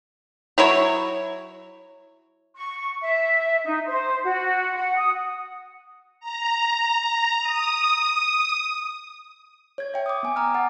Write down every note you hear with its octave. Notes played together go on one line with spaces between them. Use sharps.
F#3 E4 C#5
C#6
E5
D#4
C5
F#4
F#5
D#6
A#5
D#6
C#5 G#6
E5 G5
D6 D#6
B3 G#5
A#5 D6 D#6 F6
F#5 G#5 F6 A6